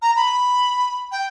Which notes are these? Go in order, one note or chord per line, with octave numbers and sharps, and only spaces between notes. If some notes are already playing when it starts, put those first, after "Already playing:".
A#5
B5
G5